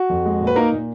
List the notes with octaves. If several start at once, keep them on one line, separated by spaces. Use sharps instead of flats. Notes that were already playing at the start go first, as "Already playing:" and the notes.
Already playing: F#4
F2
G#3
A#2
B4
A#3 D#4 A#4
A#2